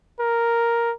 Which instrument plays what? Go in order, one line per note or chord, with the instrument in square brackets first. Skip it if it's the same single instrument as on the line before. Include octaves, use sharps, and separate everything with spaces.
[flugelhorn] A#4